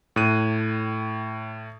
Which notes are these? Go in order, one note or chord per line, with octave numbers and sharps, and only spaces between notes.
A2 F#6 D#7